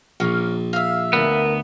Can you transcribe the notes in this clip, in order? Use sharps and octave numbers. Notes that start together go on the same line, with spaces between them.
A#1 A#3 C#4
E5 F5
D2 B3 A#4